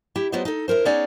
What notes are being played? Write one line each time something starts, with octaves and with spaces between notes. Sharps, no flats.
E4 G4
F#3 G3 B3 F4 C5 D#5
D#4 A4
F2 E4 A#4 C5
B3 C#4 D#4 G#4 C#5 D5